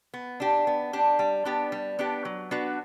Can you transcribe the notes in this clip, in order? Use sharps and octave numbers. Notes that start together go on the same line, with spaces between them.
B3
D4 G4
B3
D4 G4
G3
B3 D4 G4
G3
B3 D4 G4
F#3
B3 D4 F#4 B4